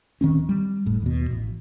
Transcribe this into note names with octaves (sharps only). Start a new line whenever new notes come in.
D1 D#3 C4 C#4
G3
F#1 A2
D#2 B2
A1